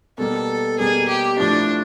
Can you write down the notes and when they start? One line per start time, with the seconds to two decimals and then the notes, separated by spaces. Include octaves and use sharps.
0.18 B2 G3 A#3 A4
0.79 B2 G3 A#3 G#4
1.08 G4
1.39 A2 F3 A3 D4